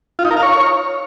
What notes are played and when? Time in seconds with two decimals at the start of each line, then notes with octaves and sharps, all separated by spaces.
0.19 F4
0.25 D#4
0.31 A#4
0.37 F5
0.43 C#5